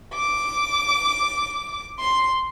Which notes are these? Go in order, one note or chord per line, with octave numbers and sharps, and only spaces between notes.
D6
C6